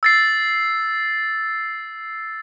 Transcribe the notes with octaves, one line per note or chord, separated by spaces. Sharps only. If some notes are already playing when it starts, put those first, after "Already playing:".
E6 A6 C7